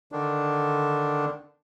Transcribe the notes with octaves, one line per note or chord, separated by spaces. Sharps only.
D3 D#3 D4